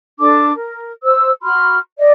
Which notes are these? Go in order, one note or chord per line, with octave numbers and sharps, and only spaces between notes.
D4 A4 A5 D6
A#4
C5 E6
F#4 B5 C6 F6
D5 D#5